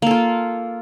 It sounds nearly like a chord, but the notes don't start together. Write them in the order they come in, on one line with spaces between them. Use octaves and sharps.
A#3 A4 F4